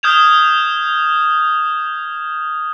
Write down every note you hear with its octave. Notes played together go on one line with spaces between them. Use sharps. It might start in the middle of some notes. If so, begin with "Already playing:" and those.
D#6 F6 G6 G#6 E7 F7